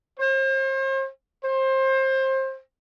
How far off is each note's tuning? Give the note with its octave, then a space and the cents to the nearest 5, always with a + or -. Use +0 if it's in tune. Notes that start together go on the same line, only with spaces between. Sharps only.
C5 +40
C5 +25